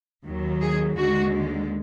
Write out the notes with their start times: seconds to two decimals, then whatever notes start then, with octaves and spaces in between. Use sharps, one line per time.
0.25 D#2 D#3 F#3
0.61 G#4
0.97 D#2 D3 G#3 F#4